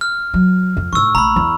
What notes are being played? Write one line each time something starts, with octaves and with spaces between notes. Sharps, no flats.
F6
F#3
F2
A2 D#3 C#6 E6
A#1 A3 A#5 B5
E2